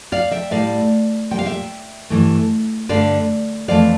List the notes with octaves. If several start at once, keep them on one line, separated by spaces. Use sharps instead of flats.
D5 F5
E5 G5
A2 G3 D5 F5
A#2 G3 F5 G5
E5 G5
G2 E3 A3
G2 D3 A3 D5 F5
F2 E3 A3 D5 F5